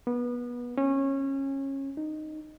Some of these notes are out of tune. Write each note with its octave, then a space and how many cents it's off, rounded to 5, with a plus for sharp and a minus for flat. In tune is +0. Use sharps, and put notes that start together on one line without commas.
B3 -25
C#4 -25
D#4 -10